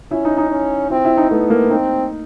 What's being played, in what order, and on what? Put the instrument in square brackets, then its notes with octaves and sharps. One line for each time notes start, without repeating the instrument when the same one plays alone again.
[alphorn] C#4 [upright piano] E4
[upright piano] D#4
D#4
[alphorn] C#4
[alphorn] C4 [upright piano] E4
[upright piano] E4
D#4
[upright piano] A3 [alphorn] B3
[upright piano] A#3
[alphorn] C4 [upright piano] D#4